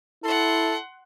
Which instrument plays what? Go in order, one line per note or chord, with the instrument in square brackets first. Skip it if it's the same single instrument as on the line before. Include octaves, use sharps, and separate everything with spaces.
[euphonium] E4 [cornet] A4 [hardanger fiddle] F#5 C6